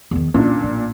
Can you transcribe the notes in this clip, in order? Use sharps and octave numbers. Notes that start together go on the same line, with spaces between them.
E2 D#3
A#2 C#4 D4
A1